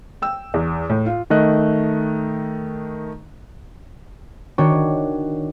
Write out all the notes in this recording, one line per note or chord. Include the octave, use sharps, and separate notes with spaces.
G5 E6
E2
A2
F4
D#3 A3 D#5 F#6
D#3 D4 F#4 C#5 G5 C#6